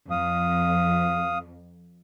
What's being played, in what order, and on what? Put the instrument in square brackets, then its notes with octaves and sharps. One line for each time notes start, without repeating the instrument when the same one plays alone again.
[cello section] F2 [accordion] F5 D#6